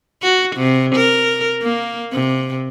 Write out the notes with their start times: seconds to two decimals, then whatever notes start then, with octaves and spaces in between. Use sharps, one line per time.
0.23 F#4
0.56 C3
0.96 A#4
1.62 A#3
2.12 C3